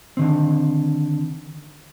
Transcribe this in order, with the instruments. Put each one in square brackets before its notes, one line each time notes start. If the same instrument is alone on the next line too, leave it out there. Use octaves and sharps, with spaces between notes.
[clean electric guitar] D3 D#3 C4